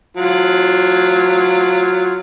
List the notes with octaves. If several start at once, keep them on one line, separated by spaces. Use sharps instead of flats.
F#3 F4